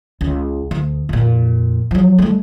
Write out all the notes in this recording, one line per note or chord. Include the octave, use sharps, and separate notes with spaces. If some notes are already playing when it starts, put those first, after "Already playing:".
C#2
D2
F2 A#2
F3 F#3
G3 A3